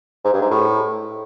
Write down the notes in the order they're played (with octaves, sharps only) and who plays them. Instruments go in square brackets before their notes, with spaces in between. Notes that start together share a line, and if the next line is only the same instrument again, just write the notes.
[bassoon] G#2
G2
G#2
A2